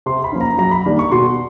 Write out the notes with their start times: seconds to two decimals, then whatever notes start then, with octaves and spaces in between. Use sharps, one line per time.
0.06 C3 C6
0.24 B5
0.32 F3 A#3 C#4
0.41 A#5
0.58 F#2 A#5
0.71 B5
0.86 D#3 G3 A#3 D4
0.99 C#6
1.12 B2 C6